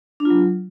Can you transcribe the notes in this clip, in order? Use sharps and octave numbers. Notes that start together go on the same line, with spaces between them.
D4
F4
F#3